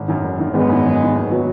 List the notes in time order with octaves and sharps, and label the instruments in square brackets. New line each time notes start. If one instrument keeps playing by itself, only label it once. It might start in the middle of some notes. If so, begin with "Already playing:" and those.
Already playing: [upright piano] G#1
F#2 D#3
G#1
F#2 D#3
[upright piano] G#1 [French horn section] G#3 B3
[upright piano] F#2 D#3
G#1
F#2 D#3
D#2
D#3 F#3 B3 F#4